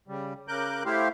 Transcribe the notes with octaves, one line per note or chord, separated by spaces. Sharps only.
C#3 G3
C#3 A#4 D6 F#6 G6
A3 E4 G4 C5 F5